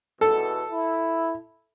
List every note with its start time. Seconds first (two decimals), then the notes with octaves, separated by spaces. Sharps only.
0.21 E2 B2 A4
0.71 E4